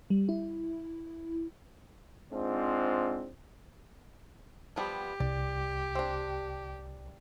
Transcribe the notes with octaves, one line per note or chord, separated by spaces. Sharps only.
G3
E4
G#2 C4 D4 F4
F3 G3 B3 G4
C2 D5
C4 D4